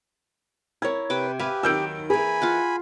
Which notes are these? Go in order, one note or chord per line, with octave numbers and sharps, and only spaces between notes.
E4 A#4 C#5 G#6
C3 B4 G5 D6
G4 B4 E5 F5 G#5
D#2 D#3 F#3 E6 G6 D7
E3 A#3 G#4 G#5 B5
F4 F5 F#5